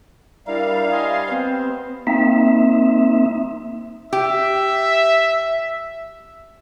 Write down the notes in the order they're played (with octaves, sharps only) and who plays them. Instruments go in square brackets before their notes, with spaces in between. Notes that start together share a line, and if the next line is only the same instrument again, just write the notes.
[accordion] G3 F5 [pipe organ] D4 E4 A#4
[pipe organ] D#5 G#5 C6
B3 C4 C5
[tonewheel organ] A#3 C4 D#4 E5
[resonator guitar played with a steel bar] G4 [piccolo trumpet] E5